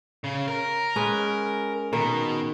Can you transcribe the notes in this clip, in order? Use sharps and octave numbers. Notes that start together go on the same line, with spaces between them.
C#3
A#4
G#3 C#4 B4
B2 D#3